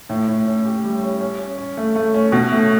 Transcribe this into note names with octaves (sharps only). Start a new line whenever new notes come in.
A2
A2
C#4
G4
G3
C#4
C#4
C#4
C#4
A3
A3
C#4
B2
A3